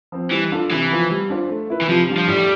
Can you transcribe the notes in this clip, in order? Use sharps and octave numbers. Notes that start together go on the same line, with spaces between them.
F3 C4
E3 G3
D4 F4 A4
C3 E3
F3 B3 F4
G3
D4 F4 C5
A3
E4 B4
E3
C3 F3
G3 D4 F4
F3
A2 G3